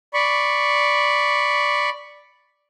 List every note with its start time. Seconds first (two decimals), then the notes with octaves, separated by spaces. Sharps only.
0.14 D5 B5 C#6